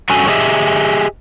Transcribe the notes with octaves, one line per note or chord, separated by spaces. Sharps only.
G2 F#3 C#4 F#4 A4 G#5
G4 G#4 D#5 E5